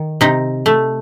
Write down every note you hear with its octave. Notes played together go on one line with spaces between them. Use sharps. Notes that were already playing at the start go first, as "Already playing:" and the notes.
Already playing: D#3
C3 D#4
A3